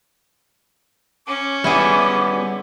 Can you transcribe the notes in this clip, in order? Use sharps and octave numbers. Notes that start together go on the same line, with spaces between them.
C#4 D6
G3 B3 E4 G#4